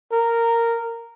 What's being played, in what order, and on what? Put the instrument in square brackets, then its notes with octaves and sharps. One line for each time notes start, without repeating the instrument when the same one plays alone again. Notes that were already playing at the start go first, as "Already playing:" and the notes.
[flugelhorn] A#4